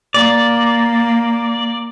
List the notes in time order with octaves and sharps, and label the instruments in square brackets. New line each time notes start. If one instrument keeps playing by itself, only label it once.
[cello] A#3 [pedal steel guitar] D5